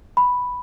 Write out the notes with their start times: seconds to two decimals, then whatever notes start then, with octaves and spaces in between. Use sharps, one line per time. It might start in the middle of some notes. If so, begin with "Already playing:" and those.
0.17 B5